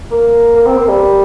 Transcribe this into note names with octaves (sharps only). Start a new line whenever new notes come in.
A#3
A#3
C4
A#3
G3